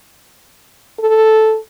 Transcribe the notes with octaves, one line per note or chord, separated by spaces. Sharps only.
A4